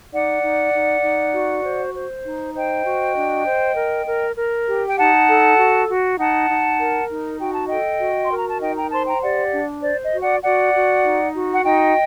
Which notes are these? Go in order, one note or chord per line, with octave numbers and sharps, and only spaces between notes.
D#4 D5 F#5
D#4
D#4
D#4
F#4
C5
C5
D#4
C5 D#5 G5
F#4
D4
C5
A#4
A#4
A#4
G4
G5
D#4 F#5 A5
A4
F#4
F#4
D#4 F#5 A5
D#4
A#4
D#4
F#4 G5
A5
A4 D#5 G5
F#4
C6
A#4
A#5
A5
D#4 D#5 G5
G5 A#5
C5 A5 C6
G5 A#5
G4 D5 F#5
D4
C5 D5
D#5
F#4
D5 F#5
F#4 D5 F#5
F#4
D#4
F#4
F#5
D#4 D#5 G5